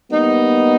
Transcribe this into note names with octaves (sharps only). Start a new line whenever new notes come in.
G3 A#3 B3 D#4